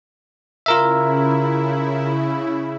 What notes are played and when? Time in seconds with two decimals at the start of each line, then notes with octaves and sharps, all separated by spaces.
0.66 C#3 E4 F4 A#4 E5